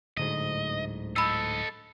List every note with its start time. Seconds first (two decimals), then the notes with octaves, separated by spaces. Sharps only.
0.17 D1 D2 G#2 D#5
1.16 A4 D#5 B5 E6